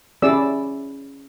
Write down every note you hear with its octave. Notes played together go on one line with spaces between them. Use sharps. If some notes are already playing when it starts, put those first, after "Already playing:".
C#4 E4 G4 G#4 D5 E6